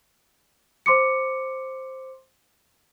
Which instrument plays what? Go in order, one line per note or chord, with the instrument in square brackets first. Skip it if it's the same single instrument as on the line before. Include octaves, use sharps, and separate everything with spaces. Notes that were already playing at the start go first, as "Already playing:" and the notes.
[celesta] C5 C6 D6 C#7